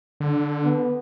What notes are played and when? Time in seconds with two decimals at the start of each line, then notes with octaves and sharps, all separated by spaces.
0.20 D3
0.64 B3